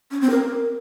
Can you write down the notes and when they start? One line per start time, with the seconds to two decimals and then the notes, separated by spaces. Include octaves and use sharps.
0.11 C#4
0.21 C4
0.30 A#4